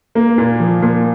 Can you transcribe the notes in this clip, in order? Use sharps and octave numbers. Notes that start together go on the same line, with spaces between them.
A#3
A#2
F3
A#2